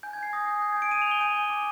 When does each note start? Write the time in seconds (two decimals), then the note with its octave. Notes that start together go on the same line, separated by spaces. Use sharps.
0.03 G#5 G6
0.13 G#6
0.18 G#5 C7
0.33 D#6 A#6
0.48 G6
0.62 G#5 G6
0.72 G#6
0.77 G#5
0.82 D7
0.91 D#6 D#7
1.02 F7
1.06 G6 G7
1.21 G#5 D#7
1.36 G#5
1.50 D6